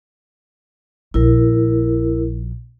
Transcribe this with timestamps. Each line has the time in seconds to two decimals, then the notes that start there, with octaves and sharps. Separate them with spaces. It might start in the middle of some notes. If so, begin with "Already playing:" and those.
1.14 A#1 E4 A#4